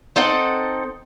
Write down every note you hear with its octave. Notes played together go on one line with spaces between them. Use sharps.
C4 D#4 A4 F#5